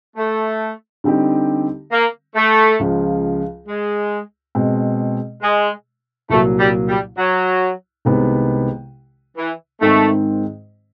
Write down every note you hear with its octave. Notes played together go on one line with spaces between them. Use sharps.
A3
D3 G3 C4 D#4 G4
A#3
A3
C#2 C#3 F3
G#3
B2 G#3 C4
G#3
C2 A#2 F#3 A3 A#3
G3
G3
F#3
C2 C3 D#3 G#3 B3
E3
G#2 D#3 G#3 A3 C4